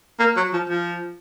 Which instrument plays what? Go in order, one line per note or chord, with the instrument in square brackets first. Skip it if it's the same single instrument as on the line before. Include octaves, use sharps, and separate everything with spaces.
[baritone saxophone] A#3
F#3
F3
F3